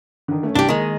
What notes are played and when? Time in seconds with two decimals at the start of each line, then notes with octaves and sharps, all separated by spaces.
0.28 D3 D#3
0.43 A3 C#4
0.55 C2 D4 G4
0.69 D#3 G#3 A#3